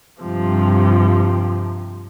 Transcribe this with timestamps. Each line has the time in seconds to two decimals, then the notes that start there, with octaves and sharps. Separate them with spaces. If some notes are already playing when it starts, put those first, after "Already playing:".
0.22 G2 C3 F3